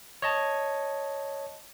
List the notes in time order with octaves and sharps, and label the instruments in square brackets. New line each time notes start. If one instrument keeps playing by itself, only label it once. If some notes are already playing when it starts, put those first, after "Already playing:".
[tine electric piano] C#5 D#5 A5